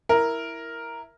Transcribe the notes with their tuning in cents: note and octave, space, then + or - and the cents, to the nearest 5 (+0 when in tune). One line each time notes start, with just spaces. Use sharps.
E4 +0 A#4 +0